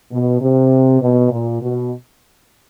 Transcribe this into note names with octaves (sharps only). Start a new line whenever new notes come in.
B2
C3
B2
A#2
B2